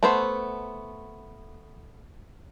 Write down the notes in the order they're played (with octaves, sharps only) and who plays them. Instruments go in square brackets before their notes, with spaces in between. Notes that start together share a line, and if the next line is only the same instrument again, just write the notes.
[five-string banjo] A3 B3 C5